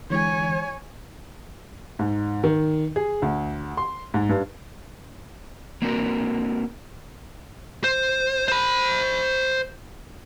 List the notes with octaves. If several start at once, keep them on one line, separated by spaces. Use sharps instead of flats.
D3 E3 G#3 C#5 G#5
G#2
D#3
G#4
D2
C6
G#2
G2
A#3 C4 D4 F#4 A#4
C5
C5 B5